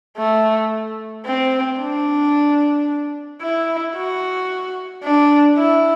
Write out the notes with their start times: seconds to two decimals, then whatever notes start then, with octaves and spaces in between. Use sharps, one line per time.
0.18 A3
1.26 C4
1.80 D4
3.42 E4
3.96 F#4
5.04 D4
5.58 E4